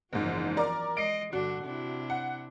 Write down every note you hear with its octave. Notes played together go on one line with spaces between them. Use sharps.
F#1 E2 G#2 F3 F#3
A#4 D5
G#3 D#5 C7 D7
G2 D3 D4 F#4
C3 D4 E4
F#5